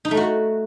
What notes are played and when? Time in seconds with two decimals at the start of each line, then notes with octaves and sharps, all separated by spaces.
0.05 D#4
0.11 A3
0.17 F#4